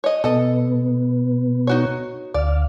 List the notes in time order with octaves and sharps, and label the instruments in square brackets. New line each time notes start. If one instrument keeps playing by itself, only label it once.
[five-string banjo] C#5 D#5
[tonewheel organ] B2 B3 [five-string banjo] A4 D#5
[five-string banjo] D#4 F#4 C#5
[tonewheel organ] D2 F5 [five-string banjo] D5